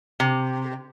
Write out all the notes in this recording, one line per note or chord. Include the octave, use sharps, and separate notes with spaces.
C3